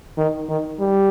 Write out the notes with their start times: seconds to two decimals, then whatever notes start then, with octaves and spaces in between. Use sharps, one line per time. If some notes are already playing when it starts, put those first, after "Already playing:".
0.18 D#3
0.49 D#3
0.80 G3